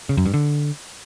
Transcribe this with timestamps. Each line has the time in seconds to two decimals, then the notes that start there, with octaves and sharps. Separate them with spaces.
0.09 C#3
0.17 F#2
0.26 G2
0.34 D3